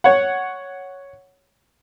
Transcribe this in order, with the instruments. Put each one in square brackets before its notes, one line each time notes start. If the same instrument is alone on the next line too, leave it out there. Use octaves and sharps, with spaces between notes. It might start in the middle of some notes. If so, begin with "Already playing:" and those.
[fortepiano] C#5 F#5